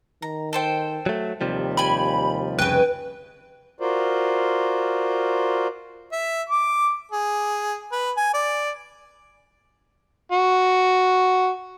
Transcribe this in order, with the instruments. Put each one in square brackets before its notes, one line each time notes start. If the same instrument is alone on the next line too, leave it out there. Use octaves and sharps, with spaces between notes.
[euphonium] D#3 [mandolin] A#5
[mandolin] A4 C5 G5
[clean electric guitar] F#3 A3
[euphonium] D#2 [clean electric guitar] C3 F3 G3
[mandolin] G4 G#5 [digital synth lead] B5
[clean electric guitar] C2 F2 C#3 [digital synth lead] B4 [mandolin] G5 G#5
[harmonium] F4 F#4 A#4 C5 D5
[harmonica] E5
D6
G#4
B4
G#5
D5
F#4